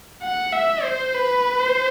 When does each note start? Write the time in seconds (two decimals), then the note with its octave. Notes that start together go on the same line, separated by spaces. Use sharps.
0.22 F#5
0.53 E5
0.83 C5
1.14 B4
1.60 C5